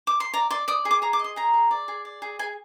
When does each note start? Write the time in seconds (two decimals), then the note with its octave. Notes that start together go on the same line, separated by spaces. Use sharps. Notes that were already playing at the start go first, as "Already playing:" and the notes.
0.07 D6
0.20 C6
0.34 D5 A#5
0.50 D5 C6
0.68 D5 D#6
0.85 G#4
0.91 D6
1.02 G#4 A#5
1.13 D6
1.19 D#5
1.24 C6
1.36 G#4 A#5
1.54 G#4
1.71 D5
1.88 G#4
2.05 D5
2.22 G#4
2.39 G#4 G#5